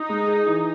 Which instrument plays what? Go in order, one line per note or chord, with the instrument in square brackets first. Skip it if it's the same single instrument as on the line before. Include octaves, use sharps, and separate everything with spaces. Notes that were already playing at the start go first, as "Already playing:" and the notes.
Already playing: [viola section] D#4
[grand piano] G#3
G#4
E3